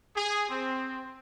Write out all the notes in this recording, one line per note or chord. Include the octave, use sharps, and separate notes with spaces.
G#4
C4